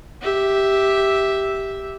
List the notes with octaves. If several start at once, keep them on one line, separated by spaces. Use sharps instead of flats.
G4 E5